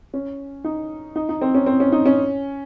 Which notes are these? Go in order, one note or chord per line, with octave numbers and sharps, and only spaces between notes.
C#4
D#4
D#4
D#4
C4
C#4
C4
C#4
D#4
C#4